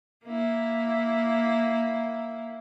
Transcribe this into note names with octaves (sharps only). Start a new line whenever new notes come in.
A#3 E4